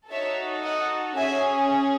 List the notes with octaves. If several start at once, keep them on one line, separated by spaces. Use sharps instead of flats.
D#4 F#4 A4 C#5 E5
D#5 F#5
C#4 G#4 E5 G#5